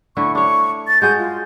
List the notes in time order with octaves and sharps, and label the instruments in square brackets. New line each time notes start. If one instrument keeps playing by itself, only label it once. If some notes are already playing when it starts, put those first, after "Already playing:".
[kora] D3 A3 E4 [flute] C#6
[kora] D4 C#5 [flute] C#6
[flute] A6
[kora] G#3 F#4 G#4 [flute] G6
[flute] F4